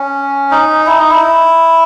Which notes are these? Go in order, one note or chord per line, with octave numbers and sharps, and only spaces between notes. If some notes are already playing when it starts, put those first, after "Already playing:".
Already playing: C#4
D#4
E4
D#4
E4